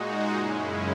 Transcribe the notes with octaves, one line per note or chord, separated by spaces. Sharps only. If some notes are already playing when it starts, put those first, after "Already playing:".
Already playing: A#2 G#3 D#4 F#4
F#2 C#3 G#3 C#4 E4